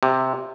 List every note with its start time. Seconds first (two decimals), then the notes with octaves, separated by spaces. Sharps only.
0.03 C3